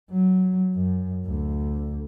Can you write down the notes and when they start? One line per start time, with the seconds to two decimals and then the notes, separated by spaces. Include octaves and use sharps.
0.11 F#3
0.75 F#2
1.25 D2